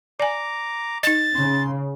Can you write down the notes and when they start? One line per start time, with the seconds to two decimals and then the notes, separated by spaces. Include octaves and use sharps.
0.20 D5 G#5 A#5 D6
1.03 D#4 D#5 A6
1.35 C#3 C6